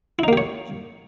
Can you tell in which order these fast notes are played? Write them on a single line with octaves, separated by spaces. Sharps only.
E4 D#4 A#3 G4 C#5